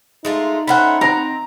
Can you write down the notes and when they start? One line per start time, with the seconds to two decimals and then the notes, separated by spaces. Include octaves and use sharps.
0.25 G#3 A3 D#4 F4
0.67 A3 C#4 C5 F#5 B5
1.01 C4 A#5